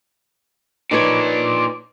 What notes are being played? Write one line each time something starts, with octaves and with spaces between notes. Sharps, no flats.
A#2 D4 D#4 B4 C#5